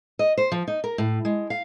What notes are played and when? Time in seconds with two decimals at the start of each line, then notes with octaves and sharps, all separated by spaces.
0.19 D#5
0.37 C5
0.52 F3
0.67 D#4
0.84 A#4
0.98 A2
1.25 G#3
1.50 F5